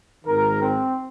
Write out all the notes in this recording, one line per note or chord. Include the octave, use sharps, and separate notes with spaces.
G#1 G#2 D#3 A#4
C4